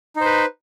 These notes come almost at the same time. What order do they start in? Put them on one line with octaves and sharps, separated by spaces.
D#4 C5 B4